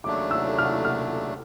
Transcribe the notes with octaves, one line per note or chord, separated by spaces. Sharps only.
D#2 C#3 F#3 A3 D4 D6
E6
F6
F6